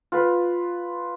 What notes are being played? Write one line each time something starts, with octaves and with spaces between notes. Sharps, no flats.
F4 B4